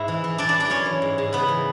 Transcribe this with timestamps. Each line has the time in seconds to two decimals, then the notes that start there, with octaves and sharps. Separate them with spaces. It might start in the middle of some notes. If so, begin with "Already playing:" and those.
Already playing: G#2 E4 E5
0.08 E3
0.24 E3
0.38 E3 D4 D5
0.49 D4 D5
0.54 E3
0.60 D4 D5
0.70 F#2 C#4 C#5
0.86 E3
1.02 G#2
1.18 G#2
1.33 C#3 B3 B4
1.48 E3